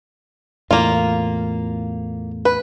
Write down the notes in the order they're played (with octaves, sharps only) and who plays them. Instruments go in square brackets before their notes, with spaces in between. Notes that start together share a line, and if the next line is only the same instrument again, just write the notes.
[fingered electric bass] E2 A2 [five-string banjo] A#3 F4
[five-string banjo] B4